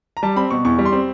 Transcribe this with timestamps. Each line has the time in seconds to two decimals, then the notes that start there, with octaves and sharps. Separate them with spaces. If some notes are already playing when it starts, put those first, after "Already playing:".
0.17 A#5
0.23 G3 A5
0.36 C4 B5
0.51 B2 C#6
0.65 E2 C#6
0.79 G3
0.85 C6
0.92 C4